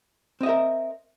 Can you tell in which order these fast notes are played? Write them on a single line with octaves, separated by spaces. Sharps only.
C4 D#5 E5 A#4